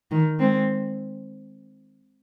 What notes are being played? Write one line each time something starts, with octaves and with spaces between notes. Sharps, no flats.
D#3
G#3 C4